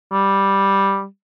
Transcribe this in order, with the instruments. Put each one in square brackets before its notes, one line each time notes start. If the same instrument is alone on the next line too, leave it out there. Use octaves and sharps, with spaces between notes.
[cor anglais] G3